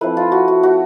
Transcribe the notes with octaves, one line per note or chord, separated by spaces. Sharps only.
F3 A3 C4 E4 B4
F4
F#4
F#4
F#4